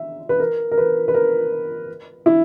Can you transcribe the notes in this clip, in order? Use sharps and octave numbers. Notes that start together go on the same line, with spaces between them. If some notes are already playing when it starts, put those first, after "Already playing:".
Already playing: E5
B4
A#4
A#4
B4
B4
A#4
E4